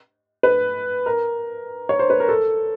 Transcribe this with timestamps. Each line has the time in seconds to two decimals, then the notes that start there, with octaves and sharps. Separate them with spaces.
0.43 B4
1.06 A#4
1.89 C#5
1.99 C5
2.10 B4
2.20 A#4
2.29 A4